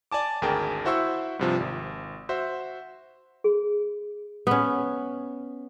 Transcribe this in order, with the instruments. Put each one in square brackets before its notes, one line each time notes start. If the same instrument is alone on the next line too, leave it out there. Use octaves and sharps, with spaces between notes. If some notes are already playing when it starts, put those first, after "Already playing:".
[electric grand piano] D5 G#5 A5 D6
G#1 D2 G#4 A#4 G5 A5
E4 F#4 C5 E5 C#6 E6
G2 C3 F3
G#1
F#4 C5 E5
[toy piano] G#4
[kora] B3 C#4